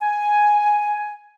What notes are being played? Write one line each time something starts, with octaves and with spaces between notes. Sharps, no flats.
G#5